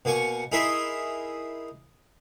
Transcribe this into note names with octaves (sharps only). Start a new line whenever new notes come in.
B2 A#3 G#5 C#6
D#4 E4 G#4 A#4 E5 C6